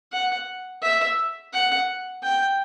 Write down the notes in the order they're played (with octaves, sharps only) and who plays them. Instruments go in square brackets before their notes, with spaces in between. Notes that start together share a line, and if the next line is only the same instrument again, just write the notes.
[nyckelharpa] F#5
E5
F#5
G5